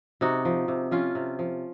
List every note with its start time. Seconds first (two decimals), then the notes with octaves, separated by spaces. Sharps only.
0.21 C3 D#4 F#4
0.45 F3
0.68 C3
0.91 F3 C#4 F4
1.15 C3
1.39 F3